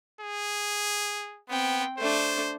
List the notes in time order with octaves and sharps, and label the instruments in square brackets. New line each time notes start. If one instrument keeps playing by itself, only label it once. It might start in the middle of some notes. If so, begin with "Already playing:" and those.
[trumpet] G#4
[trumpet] B3 [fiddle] C4 G5
[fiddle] A3 D4 [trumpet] C5